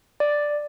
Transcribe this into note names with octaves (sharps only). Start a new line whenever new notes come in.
D5